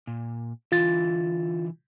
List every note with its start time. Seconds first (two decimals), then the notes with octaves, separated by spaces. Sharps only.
0.07 A#2
0.72 D3 E3 F4 A6